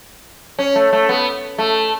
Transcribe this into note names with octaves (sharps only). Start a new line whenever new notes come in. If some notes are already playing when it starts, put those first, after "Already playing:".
C#4
A3
A3
B3
A3